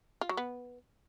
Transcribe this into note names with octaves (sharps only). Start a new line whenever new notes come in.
F4
F#3
B3